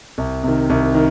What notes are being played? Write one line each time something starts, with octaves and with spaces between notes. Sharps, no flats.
C2
C3 D#3
C2
D#3